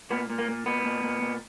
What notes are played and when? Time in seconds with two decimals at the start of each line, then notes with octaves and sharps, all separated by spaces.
0.11 A#2 B3
0.30 A#2
0.38 A#3
0.48 A#2
0.66 A#2 B3
0.85 A#2
1.03 A#2
1.21 A#2